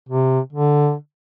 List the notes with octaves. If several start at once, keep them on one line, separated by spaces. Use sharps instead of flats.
C3
D3